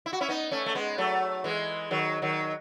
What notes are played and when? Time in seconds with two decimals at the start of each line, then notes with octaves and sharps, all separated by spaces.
0.06 E4
0.13 F#4
0.21 C#4 E4
0.28 B3 D#4
0.51 A3 C#4
0.66 A3
0.75 G#3 B3
0.98 F#3 A3
1.44 E3 G#3
1.91 D#3 F#3
2.22 D#3 F#3